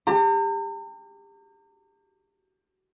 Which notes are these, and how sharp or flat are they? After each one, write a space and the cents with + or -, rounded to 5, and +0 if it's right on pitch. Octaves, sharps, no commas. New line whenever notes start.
G4 +30 A#5 -40